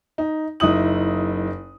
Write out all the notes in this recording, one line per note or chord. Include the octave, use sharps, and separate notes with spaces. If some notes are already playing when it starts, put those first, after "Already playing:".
D#4
F#1 D#4 E4 D#6 F#7